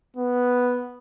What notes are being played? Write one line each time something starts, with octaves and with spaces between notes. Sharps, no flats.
B3